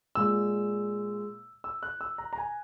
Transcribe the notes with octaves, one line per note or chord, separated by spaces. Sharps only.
A#2 G#3 E6
E6
F#6
E6
A#5
A#5
G#5